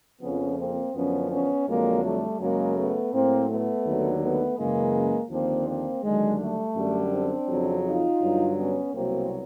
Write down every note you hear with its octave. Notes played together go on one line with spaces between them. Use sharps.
F2 C#3 F3 B3 C#4
A#3 C4
F#2 D3 F3 B3 C#4
B3 C#4
F2 D3 F#3 G#3 A#3
G3 A3
F#2 C#3 F#3 G#3 A#3
A3 B3
A2 F#3 A#3 C4
A3 B3
D#2 D3 F#3
A3 B3
F#2 C#3 E3 G#3 A#3
D#2 D3 F3 A#3 C4
A#3 C4
D#2 D3 F#3 G#3
G3 A3
F#2 D3 G3
C4 D4
F2 C#3 F#3
D#4 F4
G2 D3 F#3
B3 C#4
C2 B2 F#3 A#3 C4